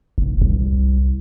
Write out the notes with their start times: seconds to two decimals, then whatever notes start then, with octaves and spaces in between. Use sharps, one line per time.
0.18 F1
0.41 C2